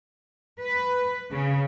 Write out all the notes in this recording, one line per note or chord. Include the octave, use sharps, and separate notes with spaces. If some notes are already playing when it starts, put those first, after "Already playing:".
B4
C#3